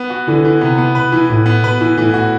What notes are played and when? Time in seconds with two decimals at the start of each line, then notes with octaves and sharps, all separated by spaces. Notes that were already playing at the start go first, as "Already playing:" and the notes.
Already playing: B3
0.10 F#4
0.28 D3 E3
0.45 E3
0.61 C3 B3
0.78 B3
0.95 B2 B4
1.12 E3
1.29 A2 E3
1.46 B3
1.63 B2 B4
1.81 E3
1.97 A2 E3
2.14 F#4